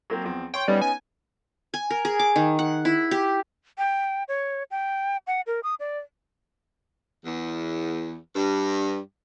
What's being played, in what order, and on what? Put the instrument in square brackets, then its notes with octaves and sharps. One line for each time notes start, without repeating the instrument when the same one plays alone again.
[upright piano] F#3 A#3 C4
E2 F3 C4
[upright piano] C#5 C6 C#6 [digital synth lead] G5
[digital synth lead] G3 [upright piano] B3 C#4 D#4
[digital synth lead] G#5
[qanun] G#5
A#4
G#4
D6
D#3
F#5
E4
G4
[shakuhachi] G5
C#5
G5
F#5
A#4
D#6
D5
[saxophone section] E2
G2